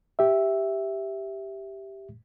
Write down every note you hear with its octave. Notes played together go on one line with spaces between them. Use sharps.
G4 E5